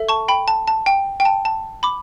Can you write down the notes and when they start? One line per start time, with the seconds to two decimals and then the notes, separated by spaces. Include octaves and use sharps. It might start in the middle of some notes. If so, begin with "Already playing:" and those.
Already playing: A4 E5
0.09 A5 C#6
0.28 G5 B5
0.48 A5
0.67 A5
0.86 G5
1.20 G5
1.25 A5
1.45 A5
1.83 B5 D6